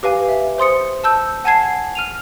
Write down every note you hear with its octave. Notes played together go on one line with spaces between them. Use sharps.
G4 B4 F5 G#5
E5
C5 C6 D#6 C#7
A5 E6 G6
F#5 G#5 A5 G#6 C7
F6 D#7 F7